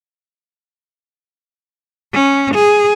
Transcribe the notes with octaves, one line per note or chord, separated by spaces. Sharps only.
C#4
G#4